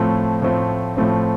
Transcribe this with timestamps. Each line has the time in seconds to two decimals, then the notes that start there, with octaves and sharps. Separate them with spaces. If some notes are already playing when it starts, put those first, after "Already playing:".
Already playing: A2 F3 A3 C4
0.42 A2 F3 A3 C4
0.97 A2 F3 A3 C4